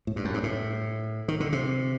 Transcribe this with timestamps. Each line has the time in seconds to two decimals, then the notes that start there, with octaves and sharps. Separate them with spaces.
0.07 A2
0.16 G2
0.25 F#2
0.34 G2
0.43 A2
1.28 D#3
1.40 D3
1.53 C3